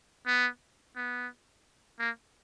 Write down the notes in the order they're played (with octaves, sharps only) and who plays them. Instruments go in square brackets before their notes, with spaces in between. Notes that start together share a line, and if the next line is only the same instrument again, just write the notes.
[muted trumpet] B3
B3
A#3